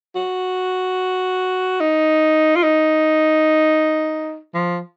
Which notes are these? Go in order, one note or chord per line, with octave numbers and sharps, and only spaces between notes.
F#4
D#4
F4
D#4
F3